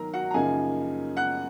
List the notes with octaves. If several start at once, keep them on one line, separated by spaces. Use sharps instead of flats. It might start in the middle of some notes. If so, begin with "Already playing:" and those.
Already playing: D#3 F#3 A#4 A#5
F#4 F#5
A#5
F#2 C#3 F3 A#3 D#4 G#4 G#5
F#5 F#6